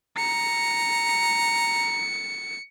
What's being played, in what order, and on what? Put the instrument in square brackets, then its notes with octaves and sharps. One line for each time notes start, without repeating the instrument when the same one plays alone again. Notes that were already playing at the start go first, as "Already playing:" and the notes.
[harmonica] A#5 [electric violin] C#7